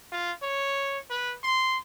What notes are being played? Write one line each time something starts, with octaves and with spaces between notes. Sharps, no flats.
F4
C#5
B4
C6